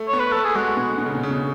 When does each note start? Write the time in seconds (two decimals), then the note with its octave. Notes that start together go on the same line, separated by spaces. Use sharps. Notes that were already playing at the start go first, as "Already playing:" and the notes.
Already playing: A3
0.08 C#5
0.13 B3
0.20 B4
0.32 A3 A4
0.44 G#4
0.55 G#3 F#4
0.77 B2
0.98 B2
1.06 C#3
1.15 B2
1.23 C#3
1.31 B2